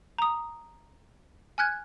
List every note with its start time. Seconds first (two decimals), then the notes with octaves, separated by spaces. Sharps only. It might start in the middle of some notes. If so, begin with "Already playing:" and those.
0.18 A#5 D#6
1.58 G#5 F6 F#6 G#6